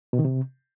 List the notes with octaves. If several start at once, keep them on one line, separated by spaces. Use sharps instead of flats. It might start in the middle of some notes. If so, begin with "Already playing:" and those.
B2
D#3
C3